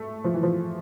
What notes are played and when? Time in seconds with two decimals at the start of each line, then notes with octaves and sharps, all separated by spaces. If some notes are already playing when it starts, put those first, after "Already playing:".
Already playing: A3
0.24 F3
0.34 E3
0.43 F3